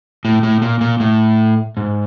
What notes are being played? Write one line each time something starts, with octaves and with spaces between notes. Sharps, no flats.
A2
A2
A#2
A#2
A2
G#2